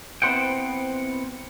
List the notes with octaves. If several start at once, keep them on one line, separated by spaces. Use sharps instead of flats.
B3 C4 E4 C5 F#5 G5